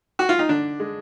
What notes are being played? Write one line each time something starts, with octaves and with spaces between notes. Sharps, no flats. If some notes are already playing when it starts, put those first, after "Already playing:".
F#4
F4
D#4
D3 D4
G#3